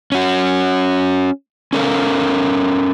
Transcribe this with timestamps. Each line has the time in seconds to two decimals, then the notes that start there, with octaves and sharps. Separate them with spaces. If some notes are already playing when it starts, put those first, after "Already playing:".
0.12 C#4 F#4
1.73 C#4 A4 A#4 F5